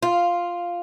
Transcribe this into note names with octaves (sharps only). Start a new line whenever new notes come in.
F4